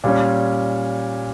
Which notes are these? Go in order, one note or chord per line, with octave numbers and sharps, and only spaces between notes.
A#2 G3 C#4